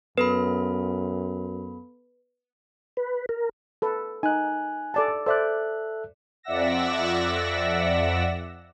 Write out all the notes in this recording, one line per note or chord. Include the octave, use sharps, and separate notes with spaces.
F#2 B3 A4 B4 B5
B4
A#4
A4 B4
D#4 G#5 F#6
A4 D5 A5
A4 C5 D5 E5 F#6
F2 D5 E5 F#5 E6 A#6